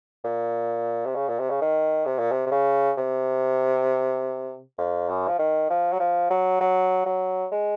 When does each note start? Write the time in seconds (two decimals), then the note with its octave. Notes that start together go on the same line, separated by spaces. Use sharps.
0.24 A#2
1.06 C3
1.15 C#3
1.29 A#2
1.40 C3
1.50 C#3
1.62 D#3
2.06 C3
2.19 A#2
2.32 C3
2.46 C3
2.51 C#3
2.98 C3
4.78 F2
5.09 F#2
5.28 F3
5.39 D#3
5.70 F3
5.93 F#3
6.00 F3
6.31 F#3
6.61 F#3
7.06 F#3
7.52 G#3